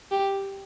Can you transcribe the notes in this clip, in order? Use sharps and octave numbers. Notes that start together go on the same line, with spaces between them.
G4